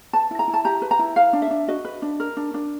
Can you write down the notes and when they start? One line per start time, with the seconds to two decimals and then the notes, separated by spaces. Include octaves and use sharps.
0.13 B4 A5
0.31 E4
0.39 A#5
0.48 E4
0.54 A5
0.65 G4 A#5
0.82 B4
0.91 A#5
0.99 E4
1.16 B4 F5
1.33 D4
1.42 E5
1.51 D4
1.68 F#4 D#5
1.85 B4
2.02 D4
2.20 A#4
2.37 D4
2.54 D4